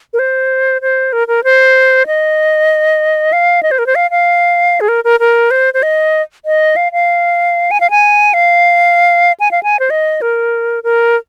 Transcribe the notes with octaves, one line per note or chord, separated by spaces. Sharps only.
A#4
C5
C5
A#4
A#4
C5
D#5
F5
D#5
C5
A#4
C5
F5
F5
G#4
A#4
A#4
A#4
C5
C5
D#5
D#5
F5
F5
G#5
F5
G#5
F5
G#5
F5
G#5
C5
D#5
A#4
A#4